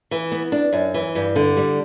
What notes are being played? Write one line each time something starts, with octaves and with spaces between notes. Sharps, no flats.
E3
B3
D4
F#2
E3
G2
D3
G3